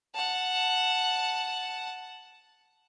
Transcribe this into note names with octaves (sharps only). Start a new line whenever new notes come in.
F#5 A5